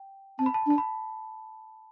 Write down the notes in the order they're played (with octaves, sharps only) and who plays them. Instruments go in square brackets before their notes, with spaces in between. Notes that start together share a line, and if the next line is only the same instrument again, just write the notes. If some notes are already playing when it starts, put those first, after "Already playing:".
Already playing: [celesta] G5
[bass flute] C4 [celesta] A5
[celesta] B5
A5
B5
[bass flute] D4
[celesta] A5
B5